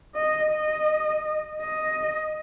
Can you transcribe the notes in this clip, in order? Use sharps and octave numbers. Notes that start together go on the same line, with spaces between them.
D#5
D#5
D#5